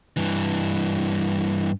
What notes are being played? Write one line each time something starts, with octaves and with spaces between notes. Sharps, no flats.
G2 E3